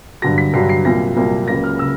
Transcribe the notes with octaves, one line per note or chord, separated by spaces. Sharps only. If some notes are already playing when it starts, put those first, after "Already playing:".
G2 D3 F#3 A#6
B6
G2 D3 F#3 C7
C7
C2 A#2 F#3 A#3 A#6
C2 A#2 F#3 A#3
C#2 C#3 F#3 A#3 A#6
F6
C#3 E6